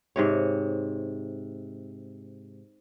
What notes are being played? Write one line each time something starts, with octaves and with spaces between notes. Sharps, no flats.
G#2 C3 C#5